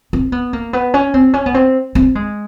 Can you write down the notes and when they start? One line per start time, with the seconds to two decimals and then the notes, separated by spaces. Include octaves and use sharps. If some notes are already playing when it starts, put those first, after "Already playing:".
0.13 C4
0.32 B3
0.53 A#3
0.73 B3
0.94 C#4
1.14 C4
1.34 C#4
1.46 B3
1.54 C4
1.95 C4
2.15 G#3